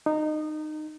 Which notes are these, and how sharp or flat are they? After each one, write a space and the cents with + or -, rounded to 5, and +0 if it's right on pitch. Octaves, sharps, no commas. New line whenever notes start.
D#4 -20